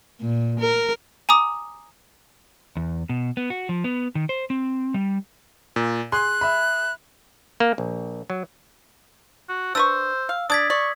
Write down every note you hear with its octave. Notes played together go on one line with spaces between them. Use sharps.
A#2
A#4
G#5 A#5 D6 D#6
E2
B2
B3
F#4
F3
B3
D#3
C5
C4
G3
A#2
G#4 C6 F#6
E5 B5
A#3
A#1
F#3
F#4
D4 B4 C5 C#6 E6
F5
D4 D5 D#6 G#6 B6
D5 C#6